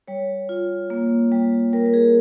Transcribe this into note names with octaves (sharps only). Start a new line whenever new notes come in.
G3 C#5
F4
A#3
G3
G3 A#4
A#4
G#4